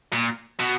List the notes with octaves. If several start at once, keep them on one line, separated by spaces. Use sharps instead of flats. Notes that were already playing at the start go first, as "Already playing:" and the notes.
A#2
B2